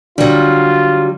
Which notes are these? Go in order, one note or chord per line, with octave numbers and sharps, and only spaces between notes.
D3 F#3 G3 D4 F4